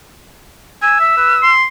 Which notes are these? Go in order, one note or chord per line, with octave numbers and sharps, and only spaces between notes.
G#5 E6
E5
B4
C6